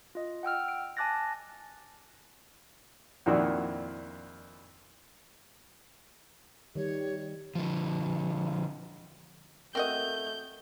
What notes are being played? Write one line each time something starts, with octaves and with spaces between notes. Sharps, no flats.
F4 D#5
F#5 G5 E6 F6
D7
G#5 A5 D6 F#6 A6 A#6
F2 A#2 D#3 D4 E4 F#4
D#3 G3 G4 C#5
D3 F3
A3 C4 F#4 A#4 D#5 G6